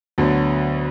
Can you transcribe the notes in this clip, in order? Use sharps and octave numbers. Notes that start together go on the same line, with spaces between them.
D2 D3 F#3 B3